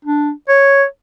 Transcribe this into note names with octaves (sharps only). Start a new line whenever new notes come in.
D4
C#5